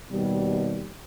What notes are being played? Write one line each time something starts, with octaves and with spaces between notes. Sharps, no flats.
D#2 B2 G3